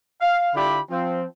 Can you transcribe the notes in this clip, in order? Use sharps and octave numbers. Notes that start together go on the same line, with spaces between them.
F5
D3 E4 F4 G4 D5 B5
F3 C4